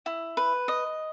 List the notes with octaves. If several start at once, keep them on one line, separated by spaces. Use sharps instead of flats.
E4
B4
D#5